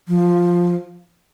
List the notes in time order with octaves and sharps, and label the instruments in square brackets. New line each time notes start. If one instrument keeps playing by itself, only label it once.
[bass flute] F3